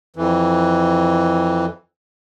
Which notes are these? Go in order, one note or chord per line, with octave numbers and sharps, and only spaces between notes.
F2 E3